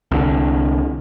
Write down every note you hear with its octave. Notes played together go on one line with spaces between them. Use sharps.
C2 D3